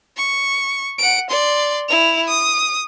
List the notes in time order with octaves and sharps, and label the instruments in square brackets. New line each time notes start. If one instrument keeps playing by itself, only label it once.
[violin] C#6
F#5 D7
D5 C6
E4 F7
D#6